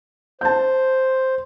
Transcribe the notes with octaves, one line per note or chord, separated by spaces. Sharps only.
C5 A5 G6